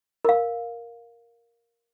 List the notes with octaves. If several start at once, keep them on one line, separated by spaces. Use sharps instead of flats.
A#4 F5